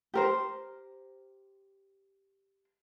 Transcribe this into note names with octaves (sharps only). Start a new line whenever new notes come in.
G4 A#4 C5